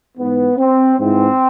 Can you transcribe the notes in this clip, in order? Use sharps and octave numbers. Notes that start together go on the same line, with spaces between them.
G#2 E3 B3
C4
G#2 E3 C4